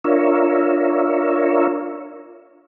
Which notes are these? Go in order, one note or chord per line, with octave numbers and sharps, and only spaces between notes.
D4 F4 A#4 C#5 E5